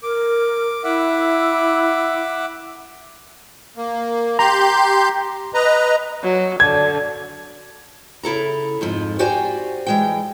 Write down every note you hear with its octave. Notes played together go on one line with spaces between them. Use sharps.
A#4 D6
E4 E5 F#5 D6
A#3
G4 A#5 C6 G6
B4 D#5 A#5
F#3
D3 G#6
C#3 E4 A4 A#5
F2 G#2 F3
F#4 G4 C5 D5 G5 G#5
E3 G#3 G5